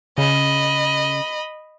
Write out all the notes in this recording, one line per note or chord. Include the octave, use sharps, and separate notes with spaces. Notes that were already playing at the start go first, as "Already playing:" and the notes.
C#3 D#5 B5